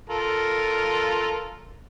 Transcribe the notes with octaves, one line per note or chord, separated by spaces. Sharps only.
F4 A4 A#4